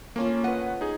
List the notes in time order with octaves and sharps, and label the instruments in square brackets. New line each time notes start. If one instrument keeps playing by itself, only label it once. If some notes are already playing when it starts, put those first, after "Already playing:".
[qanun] A3 C#4 F4 [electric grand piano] A#3
[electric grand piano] B4 F#5 [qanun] D#5
[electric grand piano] D#4 G#4